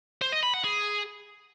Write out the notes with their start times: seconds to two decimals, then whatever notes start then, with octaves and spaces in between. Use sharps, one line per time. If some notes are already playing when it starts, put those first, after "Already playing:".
0.22 C5
0.32 D#5
0.43 B5
0.54 F#5
0.64 G#4